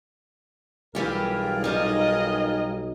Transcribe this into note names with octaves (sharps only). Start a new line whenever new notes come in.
B1 E3 G3 F4 G4 G#4 A#4
G3 D#4 D#5